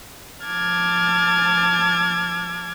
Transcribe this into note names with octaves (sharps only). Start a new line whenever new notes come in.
F3 A5 D6 F6 G#6 A6